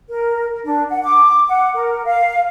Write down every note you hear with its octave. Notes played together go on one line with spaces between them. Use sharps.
A#4
D4
F#5
D6
F#5
A#4
F5